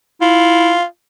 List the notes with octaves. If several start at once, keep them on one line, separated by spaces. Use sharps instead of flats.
E4 F4